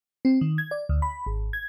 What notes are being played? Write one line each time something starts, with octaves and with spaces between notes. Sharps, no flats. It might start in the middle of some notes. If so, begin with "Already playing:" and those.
C4
D#3
G#6
D5
D2
B5
G#1
G#6